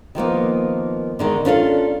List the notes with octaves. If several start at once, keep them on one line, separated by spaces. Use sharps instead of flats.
D#3 F3 A#3 B3
D3 D#3 G#3
C#4 D4 F4 A4